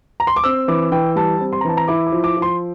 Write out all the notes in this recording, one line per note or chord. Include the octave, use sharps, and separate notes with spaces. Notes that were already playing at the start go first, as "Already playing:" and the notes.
A#5
C6
D6
C4 E6
E3 D6
E3 G5
G3 A5
C4
C6
A#5
E3 A5
A#5
E4 D6
D6
F3
D6
F3
C6